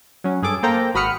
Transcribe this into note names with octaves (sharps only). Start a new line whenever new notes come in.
F#3 C#4
G2 G#4 A4 D6
A#3 A4 C5 G5 A#5
G#1 F#4 B5 D#6 F6 C#7